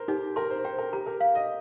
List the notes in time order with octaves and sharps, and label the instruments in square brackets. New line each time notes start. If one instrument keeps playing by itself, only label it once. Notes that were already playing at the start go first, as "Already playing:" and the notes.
Already playing: [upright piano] A#4 C5
[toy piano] D#4 [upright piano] G4
[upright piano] A#4 [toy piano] C6
[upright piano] C5
[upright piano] C5 [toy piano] G5
[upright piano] A#4
[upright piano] G4 [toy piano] A#5
[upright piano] A#4
[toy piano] F5
[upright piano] D#5